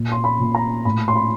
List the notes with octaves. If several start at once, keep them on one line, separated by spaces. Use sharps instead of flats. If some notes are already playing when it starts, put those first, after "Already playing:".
Already playing: A#2
C6
B5
A#2
A#5
A2 B5
C6
B5